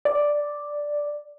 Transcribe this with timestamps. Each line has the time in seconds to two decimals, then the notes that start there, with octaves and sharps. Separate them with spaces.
0.05 D5